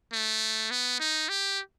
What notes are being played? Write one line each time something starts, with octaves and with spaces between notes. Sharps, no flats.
A3
B3
D#4
G4